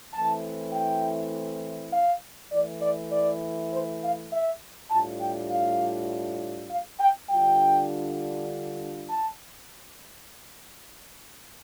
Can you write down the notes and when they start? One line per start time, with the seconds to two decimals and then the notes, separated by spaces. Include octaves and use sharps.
0.13 E3 A3 C4 E4 A5
0.73 G5
1.92 F5
2.51 E3 A3 E4 D5
2.82 D5
3.12 D5
3.72 C5
4.02 F5
4.31 E5
4.90 A2 G3 D4 F4 A5
5.21 G5
5.51 F5
6.70 F5
7.01 G5
7.30 D3 G3 D4 F4 G5
9.09 A5